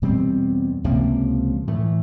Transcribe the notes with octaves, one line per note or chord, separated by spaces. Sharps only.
E2 B2 G3 C4
C#2 C3 F3 A#3
A2 E3 A3